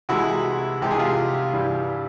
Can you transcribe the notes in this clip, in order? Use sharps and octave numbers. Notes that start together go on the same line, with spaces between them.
C2 C3 E3 G#3 E4 F#4
C2 C3 E3 G#3 G4
G#4
F4 G4
G2 E3 G3